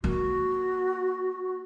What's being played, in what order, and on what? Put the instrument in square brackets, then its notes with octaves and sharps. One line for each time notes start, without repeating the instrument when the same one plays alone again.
[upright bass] A#3 [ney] F#4